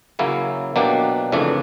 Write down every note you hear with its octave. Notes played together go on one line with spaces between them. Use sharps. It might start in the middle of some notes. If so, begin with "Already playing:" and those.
C#3 F#3 A#3 C#4 E4
B2 F#3 A#3 D4 G4
F2 C#3 E3 A3 D4